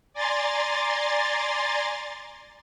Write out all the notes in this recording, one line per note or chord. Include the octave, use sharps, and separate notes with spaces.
D5 G#5 A#5 C6 A6